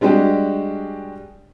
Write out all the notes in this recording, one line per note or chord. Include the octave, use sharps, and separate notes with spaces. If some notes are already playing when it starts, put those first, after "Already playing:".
G3 G#3 D4 F#4 G4